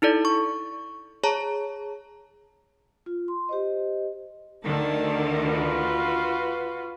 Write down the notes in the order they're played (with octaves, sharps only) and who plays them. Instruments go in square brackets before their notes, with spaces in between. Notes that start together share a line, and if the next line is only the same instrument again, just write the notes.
[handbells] D#4 E4 A4 D5
C#6
G#4 C#5 A5 A#5
[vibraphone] F4
C6
G4 C5 D#5
[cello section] D2 D3 D#3 [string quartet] A5
[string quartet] F4 F#4 B4